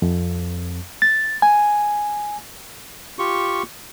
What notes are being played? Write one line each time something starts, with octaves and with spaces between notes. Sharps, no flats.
F2
A6
G#5
F4 G4 C#6